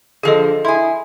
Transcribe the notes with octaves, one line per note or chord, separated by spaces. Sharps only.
D3 F3 G#4 A4 D#5
E4 G#4 C6